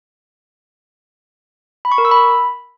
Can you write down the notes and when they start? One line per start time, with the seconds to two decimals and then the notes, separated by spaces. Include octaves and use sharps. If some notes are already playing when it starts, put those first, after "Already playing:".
1.85 B5
1.92 C#6
1.98 A#4
2.05 E6
2.11 B5